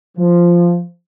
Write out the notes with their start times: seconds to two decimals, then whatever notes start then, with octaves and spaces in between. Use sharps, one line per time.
0.18 F3